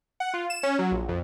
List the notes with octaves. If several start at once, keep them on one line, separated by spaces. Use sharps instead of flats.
F#5
F4
E7
C#4
F#3
A#1
F2